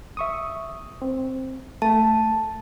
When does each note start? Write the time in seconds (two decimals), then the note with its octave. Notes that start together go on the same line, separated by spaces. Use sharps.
0.17 E5 C#6 D#6
1.02 C4
1.82 A3 A5